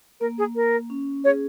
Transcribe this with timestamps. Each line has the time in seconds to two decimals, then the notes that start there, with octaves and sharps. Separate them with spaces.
0.20 A#3 A#4
0.38 G#4
0.56 A#4
0.90 C#4
1.24 G#4 C#5